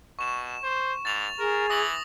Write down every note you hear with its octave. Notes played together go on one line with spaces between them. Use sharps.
B2 C#6 E7
C5
G#2 A6 F7
G#4 A#4
E3 D#6 A#6 F#7